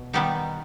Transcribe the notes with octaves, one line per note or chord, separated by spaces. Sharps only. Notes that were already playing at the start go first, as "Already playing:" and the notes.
Already playing: B2
D#3 G3 B3 D#4 G4